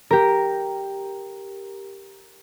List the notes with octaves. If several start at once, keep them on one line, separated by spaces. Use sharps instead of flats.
G4 A#4